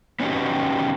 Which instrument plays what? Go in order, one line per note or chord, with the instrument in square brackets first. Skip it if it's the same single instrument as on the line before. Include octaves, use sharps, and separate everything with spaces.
[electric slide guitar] B3 C#4 D#4 F#4 G4